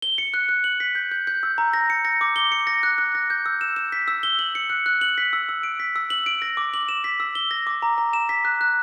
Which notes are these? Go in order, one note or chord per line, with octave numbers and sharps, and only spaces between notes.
G7
C#7
F#6
F#6
F#7
B6
G6
G6
G6
E6
A#5
A#6
C#7
A#6
D6
G7
C#7
A#6
F#6
F#6
A#6
G6
E6
E7
E7
B6
E6
G7
F#7
C#7
F#6
F#6
F#7
B6
E6
E6
D7
B6
E6
F#7
D7
A#6
D6
F#7
E7
B6
E6
G7
A#6
D6
A#5
A#5
E7
B6
F#6
F#6